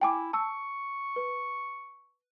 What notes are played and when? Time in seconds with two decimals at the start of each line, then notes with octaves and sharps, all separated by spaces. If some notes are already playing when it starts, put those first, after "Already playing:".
0.01 E4 G5 G#5 D6
0.33 A5 C#6 E6
1.16 B4